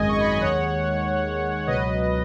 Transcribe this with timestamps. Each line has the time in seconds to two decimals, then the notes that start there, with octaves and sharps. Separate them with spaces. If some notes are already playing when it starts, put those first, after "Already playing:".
Already playing: G#1 F#2 D#3 G#3 D#5 G#5
0.09 C#6
0.21 B5
0.31 G#5
0.41 D#2 D#3 G#3 C#5 F#5
1.67 C#2 B2 F#3 B4 D#5